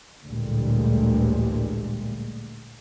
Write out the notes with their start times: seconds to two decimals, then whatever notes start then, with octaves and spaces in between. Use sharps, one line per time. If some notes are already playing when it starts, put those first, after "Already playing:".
0.25 A1 D2 A#2 D3 G3 G#3